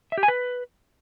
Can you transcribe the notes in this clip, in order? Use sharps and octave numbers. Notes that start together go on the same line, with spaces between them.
E5
G4
G#5
B4